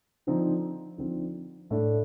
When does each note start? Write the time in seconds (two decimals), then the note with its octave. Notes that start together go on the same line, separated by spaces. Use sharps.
0.27 D3 F3 C4 D#4
0.98 D3 F3 C4 D#4
1.71 A2 A3 D4